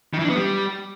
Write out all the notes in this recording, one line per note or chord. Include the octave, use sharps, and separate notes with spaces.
D#3
E3
D4
B3
G3